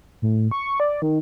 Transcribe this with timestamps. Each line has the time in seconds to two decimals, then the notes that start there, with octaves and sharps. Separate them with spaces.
0.22 A2
0.51 C#6
0.80 D5
1.02 D#3